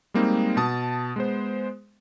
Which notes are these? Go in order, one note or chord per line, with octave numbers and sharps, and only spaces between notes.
G3 G#3 A#3 C4 D#4
B2 A5 D#6
G#3 B3 C5